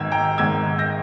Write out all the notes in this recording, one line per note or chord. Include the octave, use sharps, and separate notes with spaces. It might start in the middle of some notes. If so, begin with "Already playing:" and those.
Already playing: G#1 G#2 D#3 E6 G#6
G5 A#5
G#1 G#2 D#3 E6 G#6
G6 A#6